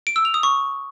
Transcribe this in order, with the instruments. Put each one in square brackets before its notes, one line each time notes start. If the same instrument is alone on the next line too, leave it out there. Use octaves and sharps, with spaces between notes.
[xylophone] D7
E6
F7
D#6
C#6